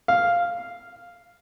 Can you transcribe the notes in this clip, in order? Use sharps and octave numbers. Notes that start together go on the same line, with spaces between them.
F5